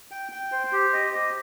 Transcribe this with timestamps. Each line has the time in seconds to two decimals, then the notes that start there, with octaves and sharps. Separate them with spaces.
0.11 G5
0.32 G5
0.52 C5
0.72 G4
0.93 D#5
1.13 D#5